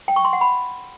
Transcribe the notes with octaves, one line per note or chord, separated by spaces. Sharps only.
G5
C#6
C6
F#5
B5